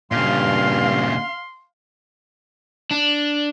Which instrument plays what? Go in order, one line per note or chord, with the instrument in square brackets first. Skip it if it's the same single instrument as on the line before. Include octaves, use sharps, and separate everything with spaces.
[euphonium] G2 [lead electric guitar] A#2 C#3 [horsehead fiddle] F5 [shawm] C6
[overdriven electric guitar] D4